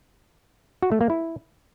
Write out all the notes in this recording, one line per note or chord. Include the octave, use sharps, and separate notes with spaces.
F#4
A3
A#3
E4